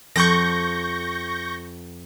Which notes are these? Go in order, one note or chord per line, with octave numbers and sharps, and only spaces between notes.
F2 C#6 G6 A#6